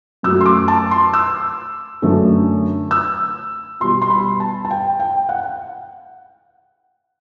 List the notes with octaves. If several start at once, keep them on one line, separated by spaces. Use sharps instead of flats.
F#2 F#3 A3 E6
C6
D6
A5
C6
E6
F#2 D3 A3
E6
B2 G3 C6
C6
B5
A5
A5
G5
G5
F#5